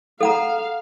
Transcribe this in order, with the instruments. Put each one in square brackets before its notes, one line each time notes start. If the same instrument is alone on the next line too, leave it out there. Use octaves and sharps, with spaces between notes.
[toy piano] A4 F#5 A#5 [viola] F5